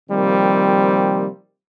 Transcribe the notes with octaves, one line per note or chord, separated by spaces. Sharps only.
C3 D#3 F3 G3 A#3 C4